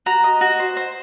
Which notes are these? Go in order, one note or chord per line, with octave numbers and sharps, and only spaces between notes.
F#4 A#5
D#5
F#4
C5
C5